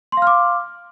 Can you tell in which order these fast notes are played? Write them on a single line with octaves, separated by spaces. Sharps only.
C6 F5 F6 D6